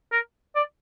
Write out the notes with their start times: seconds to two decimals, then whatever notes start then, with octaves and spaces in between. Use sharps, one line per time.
0.12 A#4
0.55 D5